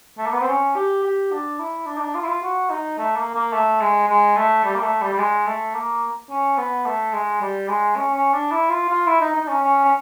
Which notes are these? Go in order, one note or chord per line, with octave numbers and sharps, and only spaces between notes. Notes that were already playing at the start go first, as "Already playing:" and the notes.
A3
A#3
B3
C4
C#4
G4
G4
D4
E4
D4
D#4
D4
F4
E4
F4
F#4
D#4
A3
A#3
A#3
A3
G#3
G#3
A3
G3
A#3
A3
G3
G3
G#3
A3
A#3
C#4
B3
A3
G#3
G3
G#3
C#4
C#4
D4
E4
F4
F4
E4
D#4
D#4
C#4
C#4
C#4